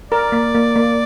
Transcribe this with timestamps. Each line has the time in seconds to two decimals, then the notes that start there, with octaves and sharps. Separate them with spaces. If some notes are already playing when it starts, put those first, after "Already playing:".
0.11 A#4 D5
0.32 A#3
0.55 A#3
0.76 A#3